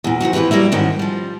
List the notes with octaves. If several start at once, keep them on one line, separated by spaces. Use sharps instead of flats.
E2 A#2
C3 D#3 F#3 F#4
F2 E3 A3 G4 B4
F#3 G3 A#3 E4
G#2 B2 D#3 G#3 C#4
F3 G3